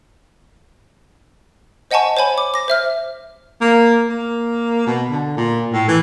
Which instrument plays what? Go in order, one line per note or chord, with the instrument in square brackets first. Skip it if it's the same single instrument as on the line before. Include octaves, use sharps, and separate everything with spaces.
[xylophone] C5 D#5 F#5 G#5 A5 C#6
C5 C#5 G#5 B5
D6
D6 A#6
C5 E5 F6
[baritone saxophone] A#3
A#3
B2
D3
A#2
A2
E3